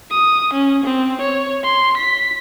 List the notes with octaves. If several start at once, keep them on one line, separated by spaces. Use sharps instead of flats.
D#6
C#4
C4
C#5
C6
B6